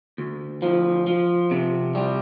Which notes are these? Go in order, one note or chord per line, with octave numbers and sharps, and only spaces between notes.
D2
F3
F3
C3
G3